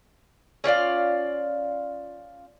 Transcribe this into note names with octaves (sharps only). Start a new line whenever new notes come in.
C#4 F4 D5 F5